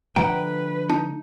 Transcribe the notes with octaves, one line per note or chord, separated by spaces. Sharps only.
D3 F3 A3 B4 F#5 G5 A#5
D#4 A5